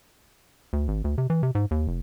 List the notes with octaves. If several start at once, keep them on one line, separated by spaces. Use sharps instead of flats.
D2
G#1
D2
C3
E3
C3
G#2
D#2
F1